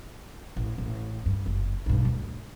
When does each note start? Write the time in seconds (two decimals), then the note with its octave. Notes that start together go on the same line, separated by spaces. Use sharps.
0.57 A1
0.78 A1
1.26 G2
1.46 F#1
1.86 B1 G2
2.05 D2